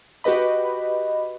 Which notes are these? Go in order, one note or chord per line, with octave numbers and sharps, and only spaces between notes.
F#4 G4 B4 D#5 B5